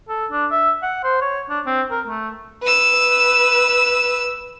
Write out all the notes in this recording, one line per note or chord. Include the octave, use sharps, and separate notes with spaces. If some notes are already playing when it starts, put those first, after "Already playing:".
A4
D4
E5
F#5
C5
C#5
D4
C4
A#4
A3
B4 E6